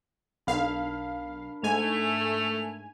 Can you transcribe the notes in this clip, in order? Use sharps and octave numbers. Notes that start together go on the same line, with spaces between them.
B1 D4 A#4 F5 B5
G#2 A3 G#5 F7